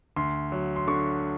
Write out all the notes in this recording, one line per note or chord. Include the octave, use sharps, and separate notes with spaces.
D2 C6
F#3
C6
D3 C#6